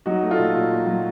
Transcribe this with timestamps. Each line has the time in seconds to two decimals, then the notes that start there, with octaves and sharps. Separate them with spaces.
0.06 F#3 D#4 F#4
0.23 A3
0.31 F4 A4
0.39 A#2
0.55 A#2
0.70 A#2
0.86 F#3